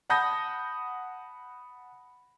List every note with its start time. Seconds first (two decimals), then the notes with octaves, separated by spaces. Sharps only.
0.10 F#5 A5 B5 D#6 G6 A#6